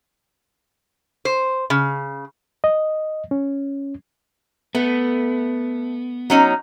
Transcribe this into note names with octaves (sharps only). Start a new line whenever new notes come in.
C5
C#3
D#5
C#4
A3 B3
F#3 C#4 D#4